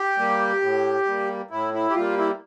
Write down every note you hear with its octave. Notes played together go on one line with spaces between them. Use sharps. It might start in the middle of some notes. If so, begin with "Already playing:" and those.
Already playing: G4
G3 A#3
A2
G3 A#3
A2 E4
E4
G4
G3 A#3 F4
E4